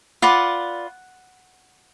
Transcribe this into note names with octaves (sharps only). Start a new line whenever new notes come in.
F4 B4 D5 F#5